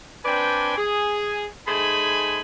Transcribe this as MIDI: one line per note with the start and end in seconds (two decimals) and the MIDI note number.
0.25 0.75 60
0.25 0.75 62
0.25 0.75 71
0.25 0.75 74
0.25 0.75 79
0.25 0.75 80
0.78 1.45 68
1.67 2.41 57
1.67 2.41 63
1.67 2.41 68
1.67 2.41 72
1.67 2.41 80
1.67 2.41 83